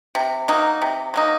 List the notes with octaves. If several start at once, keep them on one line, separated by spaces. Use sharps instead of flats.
C3
F#3 A#3 D#4
C3
F#3 A#3 D#4